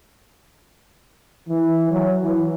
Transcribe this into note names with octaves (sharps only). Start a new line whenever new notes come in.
E3
F#3
E3